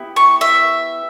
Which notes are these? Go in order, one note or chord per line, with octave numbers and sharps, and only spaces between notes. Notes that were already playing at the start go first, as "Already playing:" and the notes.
Already playing: B3 E4 G4
C#6
E5